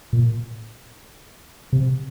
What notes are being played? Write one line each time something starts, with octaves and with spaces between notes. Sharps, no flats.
A#2
C3